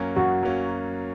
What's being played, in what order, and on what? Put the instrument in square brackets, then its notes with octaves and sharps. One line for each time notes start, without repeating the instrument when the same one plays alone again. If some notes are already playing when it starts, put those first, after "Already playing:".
Already playing: [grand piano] F#2 F#3 A#3 C#4
[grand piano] F#2 [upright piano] F#4
[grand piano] F#3 A#3 C#4